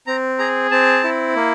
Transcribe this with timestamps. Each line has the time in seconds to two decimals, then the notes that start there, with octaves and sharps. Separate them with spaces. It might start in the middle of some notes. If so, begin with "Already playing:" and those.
0.07 C4 A#5
0.39 G#4 A#5
0.71 C4 A5
1.04 E4
1.35 A#3